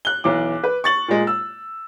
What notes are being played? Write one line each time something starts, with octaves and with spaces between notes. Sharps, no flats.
F#6 G7
B1 E3 D6
B4
C#6 A6 F#7
A#2 G#3
E6